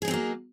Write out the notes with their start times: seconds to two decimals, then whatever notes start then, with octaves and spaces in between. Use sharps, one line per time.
0.02 G#4
0.05 D#4
0.08 C4
0.11 F#3
0.14 A#3